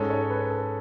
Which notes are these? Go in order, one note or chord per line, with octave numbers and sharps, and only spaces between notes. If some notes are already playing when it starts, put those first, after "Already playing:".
Already playing: G#2 G#3 C#4 A4
C#5
B4
B4
A4